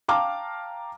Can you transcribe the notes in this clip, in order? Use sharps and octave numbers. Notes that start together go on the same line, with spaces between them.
F5 G5 A5 A#5 D6 F6